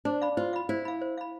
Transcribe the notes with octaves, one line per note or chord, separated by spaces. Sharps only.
D4 C5
F5 B5
F4 C5
F5 B5
E4 C5
F5 B5
C5
F5 B5